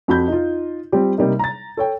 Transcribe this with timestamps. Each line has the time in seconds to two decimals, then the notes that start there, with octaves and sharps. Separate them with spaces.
0.08 F2 F#4 B5 G6
0.28 D#4 F4
0.92 G3 C4 F4 G4
1.18 C3 G3 A#3 D#4
1.39 A#5 A6
1.77 A4 C#5 G5